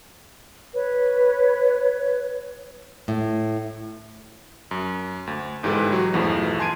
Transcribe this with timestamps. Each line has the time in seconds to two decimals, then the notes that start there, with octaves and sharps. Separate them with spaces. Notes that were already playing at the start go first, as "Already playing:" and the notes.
0.75 B4 C#5
3.08 A2
4.71 F#2
5.27 D2
5.63 G1 G#2 E3 G4 A4 B4
5.92 F#3 F#4
6.13 B1 E2 G2 E3 F3 A3
6.59 G#5 A5 C6 G#6 D7 D#7